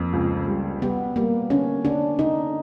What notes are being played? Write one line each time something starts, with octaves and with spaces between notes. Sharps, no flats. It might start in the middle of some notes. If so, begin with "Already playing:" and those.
Already playing: F2 A#3
C#2
G3
G3 B3
G3 A#3
D3 C#4
D3 D4
D3 D#4